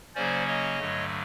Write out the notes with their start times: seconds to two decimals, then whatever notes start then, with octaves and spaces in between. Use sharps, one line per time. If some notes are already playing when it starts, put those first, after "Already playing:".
0.15 C#3 F#3 A#3 C#4 C5 D5
0.47 C#5 D#5
0.79 G2 D3 F#3 A3